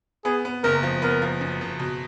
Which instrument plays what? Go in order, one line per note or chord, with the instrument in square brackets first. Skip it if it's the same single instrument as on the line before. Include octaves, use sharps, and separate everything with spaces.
[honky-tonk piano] B3 [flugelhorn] G#4
[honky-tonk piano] B3
[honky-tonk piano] F#1 [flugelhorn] A#4
[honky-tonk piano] F3
[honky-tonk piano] B3 [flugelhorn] A#4
[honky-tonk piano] F3
F#2
F#1
B2